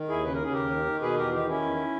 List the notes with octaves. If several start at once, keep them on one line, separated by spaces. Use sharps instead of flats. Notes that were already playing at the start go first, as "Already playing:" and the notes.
Already playing: D#3
D#2 E4 G#4
C#3 B4
A#4
C#3 G#4
D#2 G4 A#4
D#3
D#3
B2 G#4 B4
E2 G4 A#4
D#3 D#4 G4
D#3 C#4 E4
E2